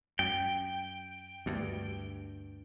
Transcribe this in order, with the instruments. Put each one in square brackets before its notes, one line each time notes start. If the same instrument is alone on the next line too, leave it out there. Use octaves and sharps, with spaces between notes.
[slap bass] F#2 [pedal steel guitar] G5
[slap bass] D2 G2